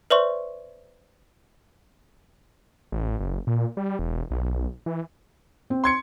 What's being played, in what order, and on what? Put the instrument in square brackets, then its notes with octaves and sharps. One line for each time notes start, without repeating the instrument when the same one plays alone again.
[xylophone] B4 C5 D5 E5 C6 C#6
[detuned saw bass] A1
F#1
A#2
G3
E1
B1
E3
[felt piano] C4
[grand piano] C6 G#6 C#7